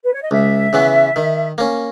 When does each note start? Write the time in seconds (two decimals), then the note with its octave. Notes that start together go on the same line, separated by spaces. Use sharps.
0.04 B4
0.13 C#5
0.22 D#5
0.31 C#2 E5
0.73 C#3 E3 B3
1.16 D#3
1.58 A#3 C#4